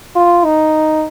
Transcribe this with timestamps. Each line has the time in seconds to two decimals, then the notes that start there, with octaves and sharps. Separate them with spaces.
0.16 F4
0.45 D#4